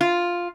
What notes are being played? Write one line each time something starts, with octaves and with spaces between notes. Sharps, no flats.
F4